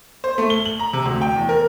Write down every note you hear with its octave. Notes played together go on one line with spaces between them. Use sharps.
C5
A3
G7
F#7
A#5
C3
D2
G5
E2
A#4